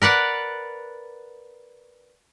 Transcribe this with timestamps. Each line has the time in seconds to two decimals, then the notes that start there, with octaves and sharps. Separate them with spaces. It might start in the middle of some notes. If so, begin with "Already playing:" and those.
0.02 A#4 B4 D5 F#5